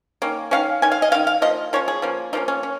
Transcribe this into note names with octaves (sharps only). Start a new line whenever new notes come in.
D#3 A#3 C#4
D#3 A#3 C#4 F5
D#3 C#4 G#5
F5
D#5
D#3 C#4 F5
F5
F3 A#3 D#5
F3 A#3 C#4 C#5
G#4
F3 A#3 C#4
F3 A#3 C#4 D#4
C#4
C#4